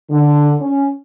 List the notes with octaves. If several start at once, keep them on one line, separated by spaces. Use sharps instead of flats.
D3
C#4